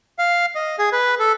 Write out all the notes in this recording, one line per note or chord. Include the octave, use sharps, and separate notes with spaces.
F5
D#5
G#4
B4
A4